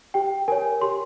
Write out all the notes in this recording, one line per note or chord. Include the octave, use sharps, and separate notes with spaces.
G4 G5
A#4 C#5 G#5
G4 C6